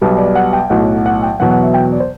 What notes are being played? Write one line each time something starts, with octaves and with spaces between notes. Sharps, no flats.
B1 B2 G3
D5
F#5
G5
B1 A2 F#3 F#5
F#5
G5
E2 B2 F#3 F#5
F#5
E5
G5
D5
C5